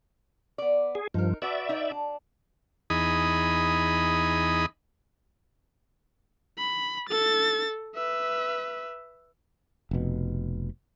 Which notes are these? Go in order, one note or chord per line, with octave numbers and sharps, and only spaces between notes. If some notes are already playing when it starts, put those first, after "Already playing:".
B3 D5
G#4
G2 F3 D#4 A#4
F#4 B4 D5 E5
D#4 B4
D4
E2 D#4 G#4 D#5 B5
B5
A4 A6
B4 E5
F1 B2